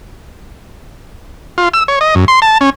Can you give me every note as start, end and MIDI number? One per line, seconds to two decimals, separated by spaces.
1.58 1.69 65
1.74 1.83 88
1.88 1.99 73
2.01 2.15 75
2.15 2.25 42
2.28 2.40 84
2.42 2.58 81
2.61 2.70 61